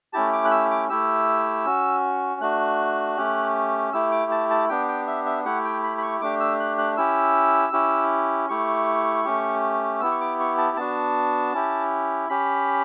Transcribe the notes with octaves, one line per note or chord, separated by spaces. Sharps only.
A3 C#4 E4 G4 A5
D6
F#6
E6
D6
A3 E4 G4 E6
C#4 F#4
A3 D4 F#4 F#6
A3 C#4 G4
A3 E4 G4 E6
D6
A5
A5
B3 D4 G4 G5
G5
E5
E5
A3 E4 G4 F#5
G5
B5
B5
C#6
A3 D4 G4 D6
E6
F#6
F#6
C#4 E4 G4 E6
C#4 E4 G4
A3 E4 G4 C#6
A3 C#4 G4
B3 E4 G4 E6
C#6
D6
C#6
A5
B3 D4 F#4 A5
C#4 E4 G4
C#4 G4 B5